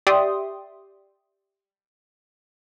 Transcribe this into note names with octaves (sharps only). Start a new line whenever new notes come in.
G4 D5 E5 G5 C6 D#6